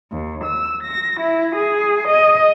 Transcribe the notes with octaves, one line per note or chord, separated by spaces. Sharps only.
D#2
E6
A#6
E4
G#4
D#5